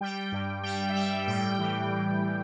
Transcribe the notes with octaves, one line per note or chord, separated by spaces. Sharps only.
G3 G5
G2
G3 G5
E5
G3 G5
A2 G5
E3
A2
A2